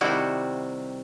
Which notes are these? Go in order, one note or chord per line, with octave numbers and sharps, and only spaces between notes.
C3 D#3 G3 E4 F#4